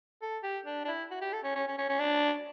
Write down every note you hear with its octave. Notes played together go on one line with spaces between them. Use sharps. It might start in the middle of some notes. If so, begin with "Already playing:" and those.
A4
G4
D4
D4
E4
F#4
G4
A4
C#4
C#4
C#4
C#4
C#4
D4